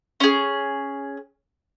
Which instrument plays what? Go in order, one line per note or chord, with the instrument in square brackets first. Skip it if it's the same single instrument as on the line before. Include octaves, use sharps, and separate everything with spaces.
[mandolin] C#4 G#4